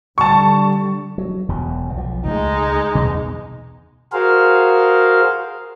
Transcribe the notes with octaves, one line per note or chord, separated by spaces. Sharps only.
D3 G3 A5 C#6
F#3
E1 E2 B2
B1 F3
C#2 G#3 A3 D#4
E2 B2
F#4 G#4 A#4 C5 F5